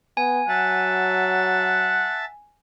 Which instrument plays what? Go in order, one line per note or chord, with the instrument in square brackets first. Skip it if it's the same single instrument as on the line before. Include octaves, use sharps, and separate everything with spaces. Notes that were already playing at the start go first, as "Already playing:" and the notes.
[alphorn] B3 [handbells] G#5
[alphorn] F#3 [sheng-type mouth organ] E5 A5 [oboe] F#5